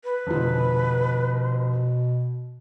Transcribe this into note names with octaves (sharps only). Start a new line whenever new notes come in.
B4
F1 B2 D3 F3